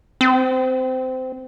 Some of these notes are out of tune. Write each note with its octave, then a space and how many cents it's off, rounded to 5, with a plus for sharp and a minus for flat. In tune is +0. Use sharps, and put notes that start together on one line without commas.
C4 -20